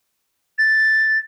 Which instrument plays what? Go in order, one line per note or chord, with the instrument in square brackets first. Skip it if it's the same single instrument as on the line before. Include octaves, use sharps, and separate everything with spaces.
[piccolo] A6